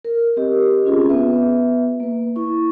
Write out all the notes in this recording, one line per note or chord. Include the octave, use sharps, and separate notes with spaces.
A#4
C4 G4 D#5
C#4 F4 G#4
B3 B4 E5
A#3 B4
E4 C#6